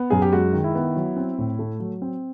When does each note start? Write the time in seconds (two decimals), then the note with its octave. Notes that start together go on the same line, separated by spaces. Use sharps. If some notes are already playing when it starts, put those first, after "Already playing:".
Already playing: B3
0.10 F#2 G#4
0.22 G4
0.32 G#3 F#4
0.53 D#3
0.64 E4
0.75 B3
0.96 F#3
1.17 C4
1.38 A2
1.59 A3
1.80 F#3
2.02 C4